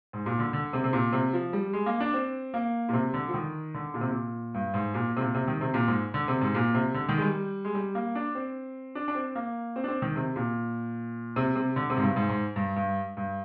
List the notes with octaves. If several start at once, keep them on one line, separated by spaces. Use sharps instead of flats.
G#2
A#2
D3
D3
C3
C3
A#2
C3
F3
G3
G#3
A#3
D4
C4
A#3
A#2
C3
D3
F3
D#3
D3
A#2
C3
A#2
G2
G#2
A#2
C3
A#2
C3
D#3
C3
A#2
G#2
D3
C3
G#2
A#2
C3
D3
D#3
G#3
G3
G#3
G3
A#3
D4
C4
D4
D4
C4
A#3
C4
D4
C4
D#3
C3
A#2
C3
C3
D3
C3
G#2
G2
G#2
G#2
G2
G2
G2